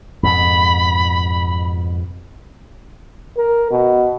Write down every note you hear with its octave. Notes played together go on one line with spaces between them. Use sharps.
F2 G#2 B2 B5
A#4
B2